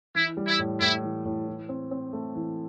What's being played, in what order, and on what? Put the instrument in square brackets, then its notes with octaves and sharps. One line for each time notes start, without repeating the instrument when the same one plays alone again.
[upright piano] E3 [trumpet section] E4
[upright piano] G3
[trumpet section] E4
[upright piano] A2
[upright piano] A2 [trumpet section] E4
[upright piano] E3
A2
E3
C4
C4
A3
E3